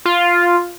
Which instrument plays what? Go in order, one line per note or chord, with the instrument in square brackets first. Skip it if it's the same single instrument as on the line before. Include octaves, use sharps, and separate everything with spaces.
[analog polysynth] F4